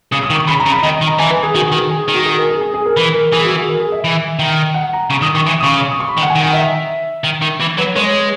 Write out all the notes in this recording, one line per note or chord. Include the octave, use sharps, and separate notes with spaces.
C#3 D#6
D#6
D#3
C#6
C#3 B5
A#5
C#3
B5
D#3 D#5
D#5
D#3
A#5
E3 G#5
B4
G#4
D#3 F#4
G#4
D#3
G#4
D#3
F#4
G#4
A#4
G#4
G#4
G#4
A#4
E3 B4
A#4
E3 G#4
F#4
G#4
A#4
G#4
E5
E3
D#3
F#5
A#5
C#3 C#6
D#3 D#6
D#3 C#6
E3 C#6
D#6
C#3 C#6
C#6
D#6
C#6
B5
D#3
F#5
G#5
D#3
F#5
E5
D#3
D#3
E3
F#3 B4
G#3 C#5